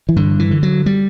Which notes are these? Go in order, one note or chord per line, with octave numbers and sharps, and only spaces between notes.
E3
G2 D3
E3
D3
F#3
G3